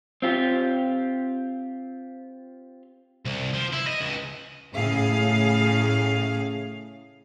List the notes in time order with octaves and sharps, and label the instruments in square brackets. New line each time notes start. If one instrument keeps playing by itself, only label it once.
[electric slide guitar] C4 F4 G4
[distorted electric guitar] C2
F3
E4
D#5
C#2
[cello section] A2 C#3 G#4 F5